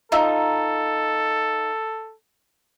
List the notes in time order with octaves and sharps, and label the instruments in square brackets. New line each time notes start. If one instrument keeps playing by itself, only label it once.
[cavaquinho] D#4 F4 [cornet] A4 [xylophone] A#5 E6